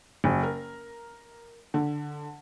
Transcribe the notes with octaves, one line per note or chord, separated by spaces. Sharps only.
F#1
A#4
D3